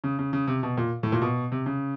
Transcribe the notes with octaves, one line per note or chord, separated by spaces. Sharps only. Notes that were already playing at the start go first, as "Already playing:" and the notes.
C#3
C#3
C#3
C3
B2
A#2
A2
A#2
B2
C3
C#3